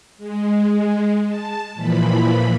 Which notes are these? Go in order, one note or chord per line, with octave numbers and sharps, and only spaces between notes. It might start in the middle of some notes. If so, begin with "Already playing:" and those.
G#3
A5
A#2 E3 F3 B5